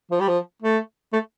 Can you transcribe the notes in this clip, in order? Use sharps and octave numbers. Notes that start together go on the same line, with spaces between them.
F3
G3
F3
A3
A3